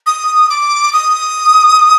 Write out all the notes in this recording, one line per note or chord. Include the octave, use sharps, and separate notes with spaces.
D#6
D6
D#6